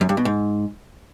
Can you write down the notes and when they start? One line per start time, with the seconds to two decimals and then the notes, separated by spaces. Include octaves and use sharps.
0.01 F#2
0.09 G2
0.17 B2
0.25 G#2